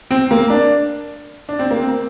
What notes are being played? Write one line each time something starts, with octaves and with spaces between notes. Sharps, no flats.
C4
A#3
D4
D4
C4
A#3
C4